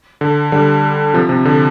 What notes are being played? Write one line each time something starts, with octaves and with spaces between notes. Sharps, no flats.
D3
D3 G3
C3 F3
C3
D3